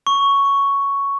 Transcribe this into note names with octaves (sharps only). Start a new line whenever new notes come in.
C#6